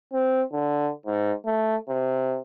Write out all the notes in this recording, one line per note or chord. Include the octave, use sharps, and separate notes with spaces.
C4
D3
G#2
A3
C3